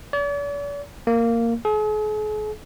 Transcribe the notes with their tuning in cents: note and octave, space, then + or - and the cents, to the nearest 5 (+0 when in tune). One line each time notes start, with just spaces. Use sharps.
D5 -45
A#3 -10
G#4 +45